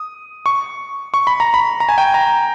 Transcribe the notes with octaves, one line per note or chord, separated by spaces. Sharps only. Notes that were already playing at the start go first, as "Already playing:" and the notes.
Already playing: D#6
C#6
C#6
B5
A#5
B5
A#5
G#5
G5
A#5